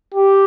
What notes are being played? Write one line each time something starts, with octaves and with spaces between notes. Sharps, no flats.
G4